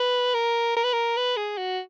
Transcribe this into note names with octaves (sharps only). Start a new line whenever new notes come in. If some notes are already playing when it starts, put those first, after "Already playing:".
Already playing: B4
A#4
A#4
B4
A#4
B4
G#4
F#4